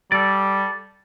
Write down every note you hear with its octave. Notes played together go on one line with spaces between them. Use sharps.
G3 A4 D5